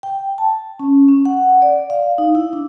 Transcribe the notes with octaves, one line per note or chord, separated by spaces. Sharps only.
G5
A5
C#4
C#4
F#5
D5
F5
D#4
E4
D4